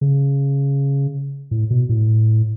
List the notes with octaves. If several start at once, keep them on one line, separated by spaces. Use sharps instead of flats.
C#3
A2
B2
A2